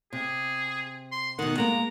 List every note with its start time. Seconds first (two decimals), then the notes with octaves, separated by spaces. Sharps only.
0.13 C3 G#4
1.12 C6
1.39 B2 D#3 F#5
1.58 G#3 A#3 A#5